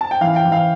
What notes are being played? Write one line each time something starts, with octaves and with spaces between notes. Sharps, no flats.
A5
G5
E3 F5
G5
E3
F5